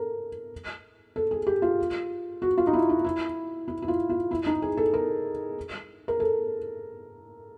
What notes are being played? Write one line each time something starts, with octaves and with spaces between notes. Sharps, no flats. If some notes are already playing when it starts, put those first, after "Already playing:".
Already playing: A4 A#4
A4
G#4
G4
F4
F#4
F4
D#4
E4
D#4
E4
E4
E4
F4
F4
E4
D#4
G#4
A4
A#4
A#4
A4